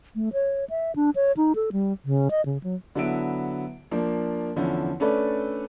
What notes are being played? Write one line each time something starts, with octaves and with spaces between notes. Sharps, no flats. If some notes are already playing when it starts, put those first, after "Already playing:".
A3
C#5
E5
D4
C#5
D#4
A4
G3
C#3
D#5
C#3
F#3
D3 F#3 B3 E4 E5 D7
F3 A#3 D4
E2 D3 F3 C#4 E4
A3 C#4 D4 A4 B4 D5